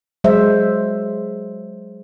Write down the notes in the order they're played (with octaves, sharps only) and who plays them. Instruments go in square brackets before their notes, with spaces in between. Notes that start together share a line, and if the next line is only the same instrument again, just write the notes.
[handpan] F#3 G#3 C5 E5